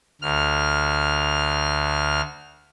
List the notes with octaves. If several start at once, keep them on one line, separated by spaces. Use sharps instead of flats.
D2 F6